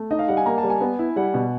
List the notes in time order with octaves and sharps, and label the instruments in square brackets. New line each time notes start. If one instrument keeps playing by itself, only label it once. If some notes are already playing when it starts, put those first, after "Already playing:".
Already playing: [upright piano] A3
[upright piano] D#4 [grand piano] D#5
[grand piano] F5
[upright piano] G3 [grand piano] F#5
[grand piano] G#5
[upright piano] A#3 [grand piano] A#5
[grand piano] A5
[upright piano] G3
[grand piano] G#5
[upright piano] B3
E4
[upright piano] G3 [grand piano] F#5
[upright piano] B2